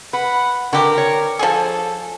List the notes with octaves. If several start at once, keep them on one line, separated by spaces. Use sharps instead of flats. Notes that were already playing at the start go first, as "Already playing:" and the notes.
B4 F#5
D3 F#4 G4 A#4
C#5
F3 G#4 A4